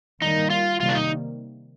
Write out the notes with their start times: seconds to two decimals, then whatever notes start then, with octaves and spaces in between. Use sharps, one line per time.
0.21 D#3 G3 A#3 D#4
0.50 F4
0.80 C3 D#3 G3 A#3 F4
0.89 D4
0.95 D#4